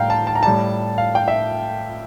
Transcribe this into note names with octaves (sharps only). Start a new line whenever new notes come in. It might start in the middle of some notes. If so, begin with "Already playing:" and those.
Already playing: A2 G3 F5 G5 A#5
A5
A5
A#5
A2 G3 A5
F5
G5
E5